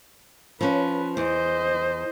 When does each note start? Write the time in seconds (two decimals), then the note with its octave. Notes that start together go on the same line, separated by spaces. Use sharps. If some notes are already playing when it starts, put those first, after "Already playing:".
0.61 F3 C#4 B4
1.17 E2 C5 D#5